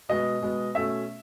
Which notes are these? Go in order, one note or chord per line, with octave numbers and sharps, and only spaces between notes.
B2 G#3 B3 D#5
B2 G#3 B3
B2 A3 C#4 E5